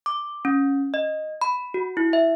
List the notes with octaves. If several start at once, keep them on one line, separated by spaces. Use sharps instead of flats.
D6
C#4
D#5
B5
F#4
E4
E5